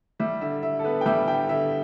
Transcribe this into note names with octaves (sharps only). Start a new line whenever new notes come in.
G3 E5
D3 E5
D3 E5
A4
B3 B4
G5
G3 E5
D3 G5
D3 E5